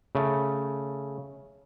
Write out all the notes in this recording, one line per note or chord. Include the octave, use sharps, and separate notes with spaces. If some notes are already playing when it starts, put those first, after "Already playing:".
C#3 A3